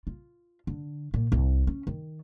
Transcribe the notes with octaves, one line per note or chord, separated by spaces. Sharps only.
F4
D3
A#2
C2
C#4
D#3